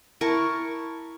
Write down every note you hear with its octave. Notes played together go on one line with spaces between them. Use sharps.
E4 A#4 A5 C#6